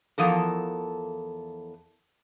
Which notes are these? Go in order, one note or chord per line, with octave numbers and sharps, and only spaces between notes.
E2 F3 A4 A#4